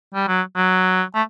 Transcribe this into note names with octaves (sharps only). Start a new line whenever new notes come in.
G3
F#3
F#3
A3